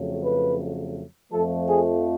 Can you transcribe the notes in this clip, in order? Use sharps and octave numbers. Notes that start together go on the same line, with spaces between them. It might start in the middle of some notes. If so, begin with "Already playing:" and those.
Already playing: F2 C#3 F#3 A3
B4
F2 F3 A3 A4
G#4